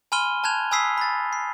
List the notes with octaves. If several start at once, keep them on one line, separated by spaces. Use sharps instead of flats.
G#5 B5 C6 F6 D#7 G7
A5 F#6 G#6 F7
G#5 B5 D#6 E6 B6 C7
B5 A6
C7